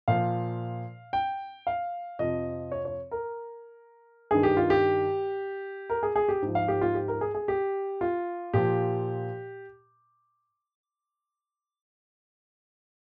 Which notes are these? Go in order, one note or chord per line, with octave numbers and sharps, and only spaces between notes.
A#2 F3 F5
G5
F5
F2 C3 F3 D#5
C#5
C#5
A#4
G2 D#3 G#4
G4
F4
G4
A#4
G#4
G#4
G4
G#2 F3
F5
G4
F4
G4
A#4
G#4
G#4
G4
F4
A#2 F3 G4